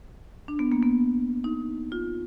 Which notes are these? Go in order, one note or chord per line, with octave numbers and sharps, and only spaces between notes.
D4
B3
A#3
B3
D#4
F4